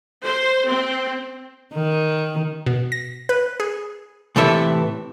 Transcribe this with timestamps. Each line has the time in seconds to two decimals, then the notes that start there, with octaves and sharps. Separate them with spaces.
0.25 C5
0.68 C4
1.74 D#3
2.66 B2
2.92 A#6
3.29 B4
3.60 G#4
4.36 A2 C3 E3 A4 E5